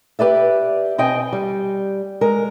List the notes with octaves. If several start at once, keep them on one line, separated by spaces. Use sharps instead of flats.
G4 B4 D5 E5
B2 C4 D#5 G5 G#5
G3
G#3 A#4